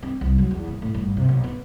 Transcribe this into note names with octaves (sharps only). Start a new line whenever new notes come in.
C4
C2
F#3
E2
D#1
A2
G1
C3
B1
B3